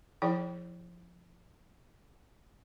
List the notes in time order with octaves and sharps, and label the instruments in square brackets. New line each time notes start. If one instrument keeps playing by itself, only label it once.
[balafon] F3 E4 G#4 D5 G5